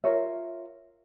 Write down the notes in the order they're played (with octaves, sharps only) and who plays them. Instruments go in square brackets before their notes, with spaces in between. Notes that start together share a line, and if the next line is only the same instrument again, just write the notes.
[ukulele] F4 A#4 C#5 E5